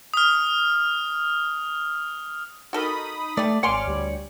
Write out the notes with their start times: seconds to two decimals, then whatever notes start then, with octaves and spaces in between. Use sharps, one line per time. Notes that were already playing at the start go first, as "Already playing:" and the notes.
0.14 D#6 F6
2.73 D#4 F#4 A4 A#4 B5 D#6
3.37 G3 A3 D5
3.63 G#1 C#5 D5 F#5 G#5 C6 D6 F6
3.85 D2 G3